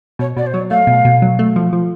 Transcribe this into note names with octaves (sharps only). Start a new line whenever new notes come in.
B2 C#5
B2 D5
C5
F#3 C#5
A3 F5
B2
B2
F#3
A3
F3
F3